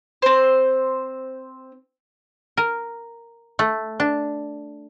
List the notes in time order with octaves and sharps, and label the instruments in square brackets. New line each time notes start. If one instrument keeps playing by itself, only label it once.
[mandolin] C4 C5
[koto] A#4
A3
D4